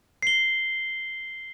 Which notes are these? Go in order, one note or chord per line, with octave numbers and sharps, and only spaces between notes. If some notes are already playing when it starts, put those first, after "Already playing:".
C7 G7